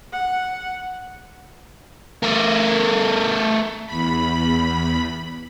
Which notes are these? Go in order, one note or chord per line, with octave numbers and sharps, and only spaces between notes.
F#5
A3 A#4
E2 B5